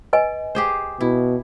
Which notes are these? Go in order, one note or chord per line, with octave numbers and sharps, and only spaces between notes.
B4 D#5 G#5
G4 G#4 C5
B2 E4